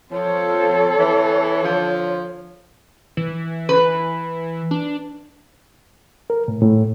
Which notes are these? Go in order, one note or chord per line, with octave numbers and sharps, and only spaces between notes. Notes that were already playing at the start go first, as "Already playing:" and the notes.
F3 C4 A4 C#5
E3
D3 F3
E3
B4
D4
A#4
A2
A2